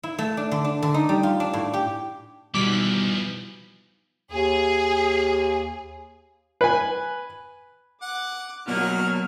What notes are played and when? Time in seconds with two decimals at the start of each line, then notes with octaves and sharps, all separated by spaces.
0.03 E4
0.18 A3
0.37 D4
0.51 D3
0.64 D4
0.83 D3
0.94 D#4
1.09 G3
1.23 F4
1.40 D4
1.53 A2
1.73 G4
2.54 B2 E3 F3 G3 D#4 D6 B6
4.32 D#2 G#4
6.61 B4 G#5
8.02 F#5 D6
8.68 B2 F#3 A#3 C#4 D#4 F#4 F6